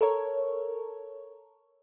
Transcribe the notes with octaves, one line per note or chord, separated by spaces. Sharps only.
A4 A#4 C#5